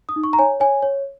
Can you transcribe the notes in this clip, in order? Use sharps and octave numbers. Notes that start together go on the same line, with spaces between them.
D#6
D#4
C#6
A#5
C#5 G#5
C#5 G#5
C#5